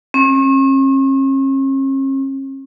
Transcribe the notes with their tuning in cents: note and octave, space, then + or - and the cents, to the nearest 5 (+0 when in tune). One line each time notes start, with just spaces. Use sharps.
C#4 -45